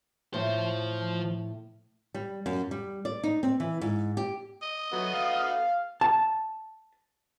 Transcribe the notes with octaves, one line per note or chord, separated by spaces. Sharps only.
A2 F3 C5
G3
F#2
G3
D5
D#4
C4
E3
G#2
G4
D#5
F#3 A3 B3 F#4
F5
A5